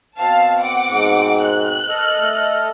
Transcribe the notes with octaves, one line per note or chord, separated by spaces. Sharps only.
B2 C4 F5 A5
F#5 D6
G#2
F#6
A4 D#5 F6
A3